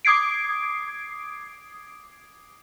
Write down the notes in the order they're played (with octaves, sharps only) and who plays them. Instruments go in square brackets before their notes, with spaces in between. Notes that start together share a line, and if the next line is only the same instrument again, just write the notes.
[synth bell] D6 D#6 G#6 C7 D7